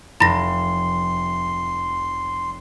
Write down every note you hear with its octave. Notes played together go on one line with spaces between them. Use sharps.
F1 E4 B5 C6 A#6